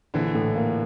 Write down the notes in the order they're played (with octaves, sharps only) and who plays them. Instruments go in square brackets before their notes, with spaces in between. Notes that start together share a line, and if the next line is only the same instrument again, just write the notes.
[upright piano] A#1 [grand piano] D3 E3
[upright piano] A2
A#3